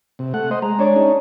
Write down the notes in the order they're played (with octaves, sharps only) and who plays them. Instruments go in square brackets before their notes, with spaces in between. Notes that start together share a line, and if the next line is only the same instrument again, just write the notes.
[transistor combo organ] C3
A3 F#5
C5 D#5
[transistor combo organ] G#3 [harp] A#5
[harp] D4 C#5 D5
[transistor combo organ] C#4 D#4